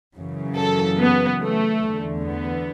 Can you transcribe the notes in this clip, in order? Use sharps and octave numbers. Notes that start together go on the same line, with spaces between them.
F#2 C#3 E3
A4
B3
A3
E2 D3
B3